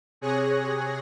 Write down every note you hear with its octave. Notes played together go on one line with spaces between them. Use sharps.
C3 G#4 C#5 G#5 F#6 A#6